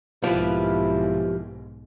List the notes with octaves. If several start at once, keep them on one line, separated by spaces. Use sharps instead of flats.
B1 G#2 F3 A#3 E4 G4 B4